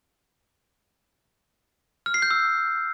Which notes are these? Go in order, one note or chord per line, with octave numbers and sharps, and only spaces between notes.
F6
C7
G6
E6